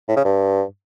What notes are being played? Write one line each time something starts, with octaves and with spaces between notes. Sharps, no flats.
A2
C#3
G2